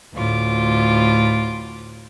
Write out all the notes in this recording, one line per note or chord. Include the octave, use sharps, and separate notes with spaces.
D2 A2 F4 D6